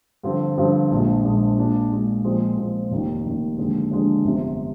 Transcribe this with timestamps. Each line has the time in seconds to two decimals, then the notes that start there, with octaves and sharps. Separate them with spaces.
0.23 G2 D3 F3 C4
0.58 G2 D3 F3 C4
0.91 A#1 A#2 G#3 D4
1.24 A#1 A#2 G#3 D4
1.58 A#2 G#3 D4
1.91 A#2 G#3 D4
2.24 A#2 F3 G#3 C4
2.58 A#2 F3 G#3 C4
2.91 F1 D#2 D#3
3.24 F1 D#2 D#3
3.58 D#2 D3 F3 G#3 D4
3.91 D#2 D3 F3 G#3 D4
4.24 G1 F2 C3